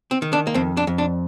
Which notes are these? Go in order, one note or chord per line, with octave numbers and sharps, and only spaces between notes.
C4
D#3
D4
A#3
F2 C4
D4
F2
D4